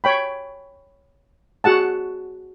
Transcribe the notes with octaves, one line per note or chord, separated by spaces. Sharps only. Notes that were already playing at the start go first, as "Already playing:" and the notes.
C#5 G5 B5
F#4 G#4 F#5 A5